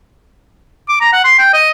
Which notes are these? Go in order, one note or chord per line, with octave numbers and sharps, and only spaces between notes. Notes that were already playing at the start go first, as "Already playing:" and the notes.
D6
A#5
F#5
C6
G5
D#5